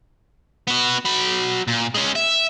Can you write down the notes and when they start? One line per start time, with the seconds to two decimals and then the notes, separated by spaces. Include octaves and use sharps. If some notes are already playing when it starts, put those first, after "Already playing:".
0.67 B3 F#4
1.05 F#3 B5
1.68 A#2
1.95 G#3 C#4
2.16 E5